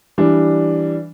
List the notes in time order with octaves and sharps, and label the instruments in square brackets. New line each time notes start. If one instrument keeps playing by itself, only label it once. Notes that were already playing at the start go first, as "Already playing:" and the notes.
[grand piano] E3 G3 D4